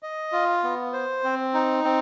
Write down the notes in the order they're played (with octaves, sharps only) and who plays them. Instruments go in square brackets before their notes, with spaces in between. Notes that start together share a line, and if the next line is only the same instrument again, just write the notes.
[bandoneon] D#5
F4
B3
C5
C4
D#4
C4